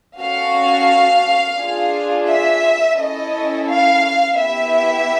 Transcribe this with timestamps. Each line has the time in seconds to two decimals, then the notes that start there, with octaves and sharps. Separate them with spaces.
0.19 C#4 F#4 A4 F5
1.58 D4 F4 G#4
2.27 E5
2.97 C#4 E4 A4 D#5
3.67 F5
4.36 B3 E4 G4 E5